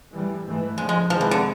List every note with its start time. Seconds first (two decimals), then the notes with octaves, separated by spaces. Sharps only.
0.13 A2 E3 G3
0.45 G#2 E3 A3
0.78 D3 F3 G#3 A3
0.89 G#3
1.10 F2 C3 D#3 F3 G#3 C4
1.21 E3
1.31 D3